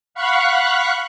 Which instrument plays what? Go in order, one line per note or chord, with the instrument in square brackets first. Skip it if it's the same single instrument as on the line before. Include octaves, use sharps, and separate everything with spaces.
[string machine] F5 F#5 B5 C#6 F#6